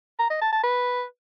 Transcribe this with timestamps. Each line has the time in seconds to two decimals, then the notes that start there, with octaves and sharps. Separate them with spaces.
0.19 A#5
0.30 D#5
0.41 A5
0.52 A5
0.63 B4